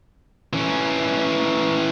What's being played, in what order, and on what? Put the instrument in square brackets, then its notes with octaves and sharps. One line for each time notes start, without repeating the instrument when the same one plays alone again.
[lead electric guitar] E3 C#4